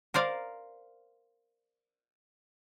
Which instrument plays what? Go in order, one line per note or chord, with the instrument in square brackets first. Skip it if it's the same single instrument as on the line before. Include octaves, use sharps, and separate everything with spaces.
[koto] A#4 C5 D5 F5